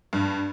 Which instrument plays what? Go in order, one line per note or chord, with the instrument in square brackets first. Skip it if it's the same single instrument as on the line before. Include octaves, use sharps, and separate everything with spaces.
[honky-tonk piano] G2